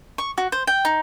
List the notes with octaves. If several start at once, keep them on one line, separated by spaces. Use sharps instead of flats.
C#6
F#4
C5
G5
D#4